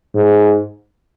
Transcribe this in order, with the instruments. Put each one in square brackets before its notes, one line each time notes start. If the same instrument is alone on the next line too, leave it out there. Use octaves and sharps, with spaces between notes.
[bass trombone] G#2